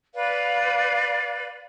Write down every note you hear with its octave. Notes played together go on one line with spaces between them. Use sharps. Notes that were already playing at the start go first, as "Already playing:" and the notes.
B4 D5 F5